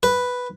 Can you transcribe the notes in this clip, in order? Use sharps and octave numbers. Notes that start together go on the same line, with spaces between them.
B4